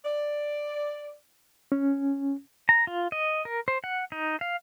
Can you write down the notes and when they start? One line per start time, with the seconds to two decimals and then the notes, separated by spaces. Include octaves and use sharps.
0.05 D5
1.72 C#4
2.69 A#5
2.87 F4
3.12 D#5
3.45 A#4
3.68 C5
3.84 F#5
4.12 D#4
4.41 F5